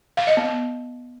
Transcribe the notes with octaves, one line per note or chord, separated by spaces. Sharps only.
F5
D#5
B3